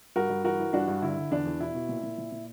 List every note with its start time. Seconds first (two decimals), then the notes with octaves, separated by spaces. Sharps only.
0.16 G2 F#4 A#4
0.30 G2
0.45 E3 F#4 A#4
0.59 E3
0.73 G2 D4 F#4
0.88 G2
1.02 D3 E4
1.16 D3
1.31 E2 D4
1.45 E2
1.60 B2 E4
1.75 B2
1.89 A#2
2.03 A#2
2.18 A#2
2.32 A#2